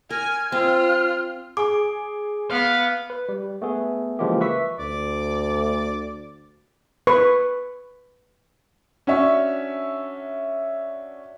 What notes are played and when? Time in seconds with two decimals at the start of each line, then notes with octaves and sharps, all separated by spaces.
0.10 A#4 G#5 F6
0.52 C4 F4
1.57 G#4 D6
2.51 B3 F5
3.10 B4
3.29 G3
3.62 A3 B3 G#4
4.19 C#3 E3 F3 G#3 A#3 G4
4.41 B4 E5 C#6 B6
4.79 D2 D5
7.07 B4 C#6
9.07 C#4 D4 F#4 C#5 E5